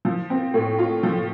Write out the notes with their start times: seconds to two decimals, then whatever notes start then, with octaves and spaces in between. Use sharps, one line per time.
0.05 F3
0.30 C4
0.54 A2
0.79 F4
1.03 F3